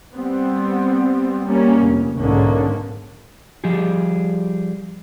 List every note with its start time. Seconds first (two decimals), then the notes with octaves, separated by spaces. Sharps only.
0.15 G3 B3 C4
1.47 G3 A#3 C#4
1.79 F1
2.18 B1 G#2 D3 A#3 C#4
3.64 F3 G3 G4 G#4